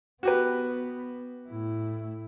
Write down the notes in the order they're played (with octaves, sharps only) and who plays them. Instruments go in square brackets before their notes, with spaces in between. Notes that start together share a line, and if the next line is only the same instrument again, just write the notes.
[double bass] B3 [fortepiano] F#4 G4 B4
[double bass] A2 E4